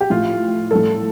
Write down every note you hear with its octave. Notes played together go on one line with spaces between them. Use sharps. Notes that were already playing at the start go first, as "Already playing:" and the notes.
G4
A2 F3 F4
A2 G3 A4